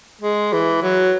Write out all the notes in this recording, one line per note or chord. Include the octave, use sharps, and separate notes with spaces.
G#3
E3
F#3